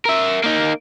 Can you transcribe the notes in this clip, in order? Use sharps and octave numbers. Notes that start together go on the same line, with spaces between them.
A#4 E5
A#3 D#4